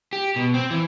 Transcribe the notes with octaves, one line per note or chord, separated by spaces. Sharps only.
G4
B2
C4
E3